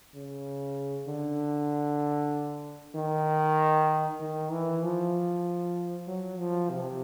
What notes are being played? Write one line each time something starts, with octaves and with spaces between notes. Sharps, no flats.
C#3
D3
D#3
D#3
E3
F3
F#3
F3
C3